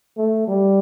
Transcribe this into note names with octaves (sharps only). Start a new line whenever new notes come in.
A3
G3